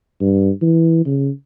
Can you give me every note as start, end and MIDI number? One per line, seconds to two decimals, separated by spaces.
0.21 0.50 43
0.62 1.03 52
1.06 1.30 49